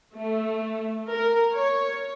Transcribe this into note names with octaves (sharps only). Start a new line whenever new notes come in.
A3
A#4
C#5